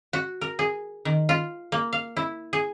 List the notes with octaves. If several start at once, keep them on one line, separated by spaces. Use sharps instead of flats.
F#4
A#4
G#4
D#3
F4
A#3
F5
E4
G#4